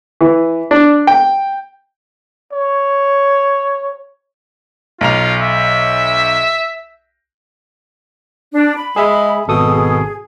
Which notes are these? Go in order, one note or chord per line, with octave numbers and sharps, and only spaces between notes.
E3
D4
G5
C#5
B1 F4 A#5 F7
E5
D4
B5
G#3 G#4 E5
G#1 B2 A4 D#6
G#4